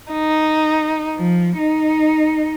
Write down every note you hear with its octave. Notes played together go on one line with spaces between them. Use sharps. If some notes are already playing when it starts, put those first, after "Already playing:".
D#4
F3
D#4